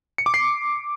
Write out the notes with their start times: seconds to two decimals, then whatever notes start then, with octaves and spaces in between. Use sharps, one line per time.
0.18 C#7
0.26 D6
0.34 C7